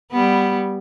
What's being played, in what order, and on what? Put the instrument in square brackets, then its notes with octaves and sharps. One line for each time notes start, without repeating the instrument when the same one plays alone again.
[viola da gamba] G3 B3